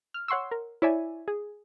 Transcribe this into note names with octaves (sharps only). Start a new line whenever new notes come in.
F6
C#5 F#5 C6 C#6 E6
A#4
E4 C#5 D5 E5 G#5
G#4